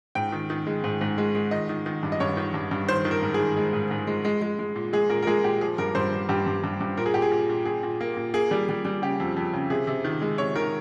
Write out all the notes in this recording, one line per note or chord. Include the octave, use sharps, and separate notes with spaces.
G#2 G5
D#3
D#3
G#3
G#2
G#2
G#3
G#3
D#3 D#5
D#3
D#3
G2
D#5
G2 C#5
D#3
G2
G2
D#3 C5
D#3
A#4
G#2
G#4
D#3
G#3
G#2
G#2
G#3
G#3
G#3
G#3
A#2
G#3 G#4
A#2 A#4
A#4
G#3 G#4
A#2 G4
F3 G#4
G2 A#4
G2 C5
G2
G2 G4
G2
G2
G2
A#2 A#4
G#4
A#2 G4
G#4
A#2
A#2
A#2 G#4
A#2
A#3
A#2
A#3 G#4
G3
G3
G3
C#3 G4
F2
F2
C#3
C3 G#4
C3
D#3
G#3
C3 C#5
D#3 A#4